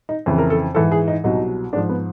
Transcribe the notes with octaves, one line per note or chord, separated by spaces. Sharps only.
D#4
F2 C#3 E3
A#4
A4
G#2 E3 A4
G#4
D#4
C2 B2 F#3 D#4
G#2 F3 D4
B3